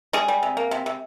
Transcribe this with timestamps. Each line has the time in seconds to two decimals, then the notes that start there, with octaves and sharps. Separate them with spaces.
0.13 G3 G#3 G#4
0.28 G3
0.43 C3
0.57 A#3
0.71 C3
0.86 C3